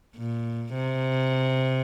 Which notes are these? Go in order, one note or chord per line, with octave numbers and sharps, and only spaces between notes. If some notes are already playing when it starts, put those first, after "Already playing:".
A#2
C3